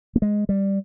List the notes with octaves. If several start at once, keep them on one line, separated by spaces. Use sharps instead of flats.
A#3
G#3
G3